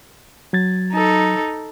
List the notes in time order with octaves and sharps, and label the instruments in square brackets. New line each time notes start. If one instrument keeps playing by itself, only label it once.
[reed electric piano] F#3 G#6 A6
[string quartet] D#4 A4